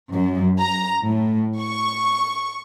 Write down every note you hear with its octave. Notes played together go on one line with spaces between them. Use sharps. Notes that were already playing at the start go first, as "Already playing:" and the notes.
F#2
A#5
A2
C#6